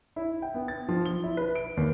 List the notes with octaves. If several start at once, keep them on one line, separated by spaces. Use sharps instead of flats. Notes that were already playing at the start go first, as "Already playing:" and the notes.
E4
G5
B3
A6
F3
G7
E4
B4
D7
D#2